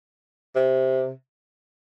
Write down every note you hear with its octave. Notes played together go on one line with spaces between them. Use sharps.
C3